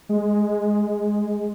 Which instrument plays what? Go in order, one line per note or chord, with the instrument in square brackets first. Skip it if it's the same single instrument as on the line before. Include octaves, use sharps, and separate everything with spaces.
[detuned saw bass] G#3